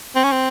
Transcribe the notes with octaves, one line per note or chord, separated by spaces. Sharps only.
C4
C#4
C4